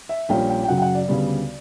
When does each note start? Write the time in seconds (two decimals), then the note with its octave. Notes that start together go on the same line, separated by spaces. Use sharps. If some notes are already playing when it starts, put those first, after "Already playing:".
0.09 E5
0.29 A#1 A#2 G3 C#4 G5
0.49 G5
0.63 G5
0.68 F#2 C#3 F#3 F#5
0.77 G5
0.82 F#5
0.95 D5
1.08 D2 C#3 G3 B3